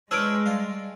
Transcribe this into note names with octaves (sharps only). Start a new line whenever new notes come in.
G#3 D4 B4 C#5 E6 F6 D7
G3 F4